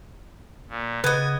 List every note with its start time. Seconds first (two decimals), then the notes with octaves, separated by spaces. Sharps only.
0.69 A#2
1.04 C#3 B3 B4 D#5 G#6